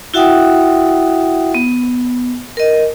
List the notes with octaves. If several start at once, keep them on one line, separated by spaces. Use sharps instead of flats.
E4 F#4 E5 F#5 G5 D#6
B3
A#4 D#5